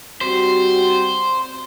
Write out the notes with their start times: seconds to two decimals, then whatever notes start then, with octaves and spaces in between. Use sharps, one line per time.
0.21 G3 C4 F#4 C5